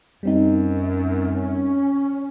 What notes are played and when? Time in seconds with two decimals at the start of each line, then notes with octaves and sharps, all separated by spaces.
0.23 F#2 G3 C4 D#4
1.35 C#4